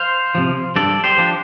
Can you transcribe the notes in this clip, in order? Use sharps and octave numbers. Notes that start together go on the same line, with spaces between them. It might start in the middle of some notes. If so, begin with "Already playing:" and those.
Already playing: C5 F5
C3 F3
G2 A4 D5
G4 C5
F3 D4